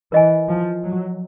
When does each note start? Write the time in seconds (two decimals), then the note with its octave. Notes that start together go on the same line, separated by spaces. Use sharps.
0.12 E3 A#4 D#5 G#5
0.49 F3
0.84 F#3